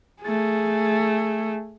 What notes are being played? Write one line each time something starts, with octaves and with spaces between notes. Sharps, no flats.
A3 G#4